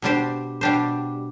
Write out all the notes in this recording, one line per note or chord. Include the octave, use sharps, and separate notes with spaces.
B2 G3 D4 G4 C5
B2 G3 D4 G4 C5